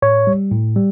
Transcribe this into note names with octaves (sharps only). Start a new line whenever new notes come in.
A2 C#5
G3
A2
G3